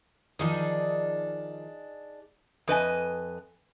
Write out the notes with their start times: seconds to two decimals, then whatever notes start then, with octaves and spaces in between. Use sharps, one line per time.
0.39 D#3 F3 D4 D#4 G#4
2.68 F2 B4 D#5 G#5